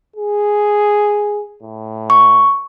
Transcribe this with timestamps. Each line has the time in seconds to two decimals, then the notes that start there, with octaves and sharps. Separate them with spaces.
0.16 G#4
1.62 A2
2.10 C#6